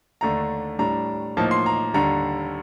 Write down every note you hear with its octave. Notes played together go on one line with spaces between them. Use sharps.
D#2 D3 A3 D4 A#5
A2 G3 D4 A#5
A2 F3 A#3 D#4 A5
C6
A#5
D#2 D3 G3 D4 A#5